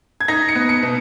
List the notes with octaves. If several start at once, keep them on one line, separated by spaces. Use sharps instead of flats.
G#6
D#4 A#6
C#7
B3
C#7
B2